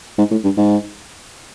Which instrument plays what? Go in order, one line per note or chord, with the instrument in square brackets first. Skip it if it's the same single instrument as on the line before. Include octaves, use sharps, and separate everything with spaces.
[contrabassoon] G#2
A2
G2
G#2